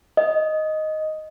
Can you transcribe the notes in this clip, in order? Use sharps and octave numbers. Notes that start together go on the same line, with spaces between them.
D#5